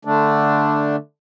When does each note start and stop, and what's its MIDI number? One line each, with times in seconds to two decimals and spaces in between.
0.05 0.96 50
0.05 0.96 57
0.05 0.96 62